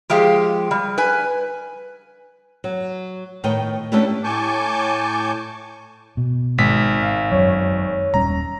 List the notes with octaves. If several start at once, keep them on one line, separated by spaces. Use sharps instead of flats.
F3 G#3 G4 F5
G3
B4 G#5
F#3
A2 D#3 B3 C#5 D#5 G5
A3 B3 C#4 D4 E4 G4
A2 G#5 A5 C#6 D6 G6
B2
G#1 G#2 B6
F5
F#2 F#3 C#5
D#1 G3 C#4 A#5